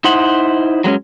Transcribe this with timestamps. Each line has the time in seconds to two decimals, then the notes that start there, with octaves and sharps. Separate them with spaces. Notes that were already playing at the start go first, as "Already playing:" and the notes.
0.04 D#4 E4 C5 F#5
0.84 F#3 G#3 B3 C#4